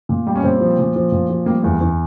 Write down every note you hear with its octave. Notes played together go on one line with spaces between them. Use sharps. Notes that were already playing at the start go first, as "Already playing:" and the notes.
A#2
G3
C#4
A#2 C4
F3
A#2
F3
A#2
F3
G3 A#3
E2 A#3
E2